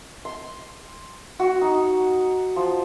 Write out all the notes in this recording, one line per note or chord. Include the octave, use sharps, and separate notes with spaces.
C6
F#4
D#4
F3